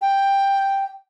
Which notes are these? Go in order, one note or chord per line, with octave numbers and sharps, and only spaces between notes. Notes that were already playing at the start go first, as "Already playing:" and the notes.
G5